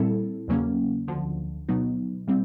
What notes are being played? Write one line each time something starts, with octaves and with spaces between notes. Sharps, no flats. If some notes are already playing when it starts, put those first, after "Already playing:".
Already playing: A#2 G3 C4 E4 A4
E2 C#3 F#3 A#3 C#4
D2 D3 F3
B2 F#3 B3 D#4
A#2 G3 C4